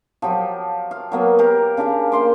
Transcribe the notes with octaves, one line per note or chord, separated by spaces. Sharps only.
F3 F#3 G4
F5
F#3 A#3 B3
G4 A#4 F5
C#3 D4 G4 F5
A#3 C6 D6